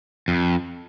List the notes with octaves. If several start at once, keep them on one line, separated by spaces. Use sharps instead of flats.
F2